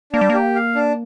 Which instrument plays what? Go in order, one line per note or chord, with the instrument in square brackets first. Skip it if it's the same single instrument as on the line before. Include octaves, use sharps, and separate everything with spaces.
[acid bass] A#3 [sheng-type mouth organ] D4
[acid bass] G3
[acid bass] A#3 [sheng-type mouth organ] G4
[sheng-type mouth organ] F5
D4